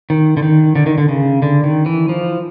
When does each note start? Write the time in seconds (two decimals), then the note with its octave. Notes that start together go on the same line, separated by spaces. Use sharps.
0.10 D#3
0.37 D3
0.43 D#3
0.75 D3
0.86 D#3
0.98 D3
1.09 C#3
1.42 D3
1.64 D#3
1.86 E3
2.09 F3